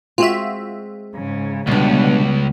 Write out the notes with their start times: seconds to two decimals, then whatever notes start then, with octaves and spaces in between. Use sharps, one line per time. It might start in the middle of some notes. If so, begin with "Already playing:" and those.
0.18 G#3 C4 F4 F#4 G#4 E5
1.15 G#2 C#3
1.67 C#2 B2 D3 G3 B3